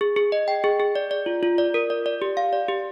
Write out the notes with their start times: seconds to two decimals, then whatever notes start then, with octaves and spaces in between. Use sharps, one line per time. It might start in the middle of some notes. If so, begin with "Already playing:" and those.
0.01 G#4
0.16 G#4
0.32 D#5
0.48 G5
0.64 G#4
0.80 G#4
0.95 D5
1.11 D5
1.26 F4
1.43 F4
1.58 D5
1.74 A#4
1.90 D5
2.06 D5
2.22 G4
2.37 F5
2.53 D5
2.68 G4